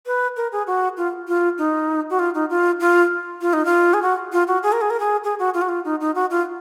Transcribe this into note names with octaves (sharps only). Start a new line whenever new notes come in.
B4
A#4
G#4
F#4
F4
F4
D#4
F#4
F4
D#4
F4
F4
F4
D#4
F4
G#4
F#4
F4
F#4
G#4
A#4
G#4
A#4
G#4
G#4
F#4
F4
F#4
F4
D#4
D#4
F#4
F4